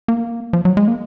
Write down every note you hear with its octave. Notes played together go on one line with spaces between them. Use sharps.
A#3
F3
F#3
G#3
A#3